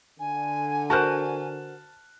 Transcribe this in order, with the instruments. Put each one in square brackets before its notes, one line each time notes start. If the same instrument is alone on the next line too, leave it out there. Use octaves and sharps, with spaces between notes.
[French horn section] D3 [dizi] G#5
[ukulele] F#4 A#4 C5 [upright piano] A5 F#6